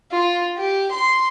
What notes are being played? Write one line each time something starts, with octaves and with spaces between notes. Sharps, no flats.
F4
G4
C6